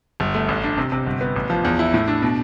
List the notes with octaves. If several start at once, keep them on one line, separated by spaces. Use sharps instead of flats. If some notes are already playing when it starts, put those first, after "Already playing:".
G1
A3
A1
D4
C3
C3
G1
B3
A1
F3
E2
E4
A2
D4
B2